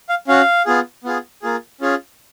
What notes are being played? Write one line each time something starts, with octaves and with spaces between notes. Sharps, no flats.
F5
C#4 F#4 F5
B3 F4 G#4
B3 F4 G#4
A#3 F4 G#4
C#4 F4 G#4